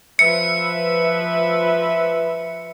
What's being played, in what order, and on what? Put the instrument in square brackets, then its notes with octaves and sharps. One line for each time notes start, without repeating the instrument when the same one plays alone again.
[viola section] F3 B4 E5 [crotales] C#7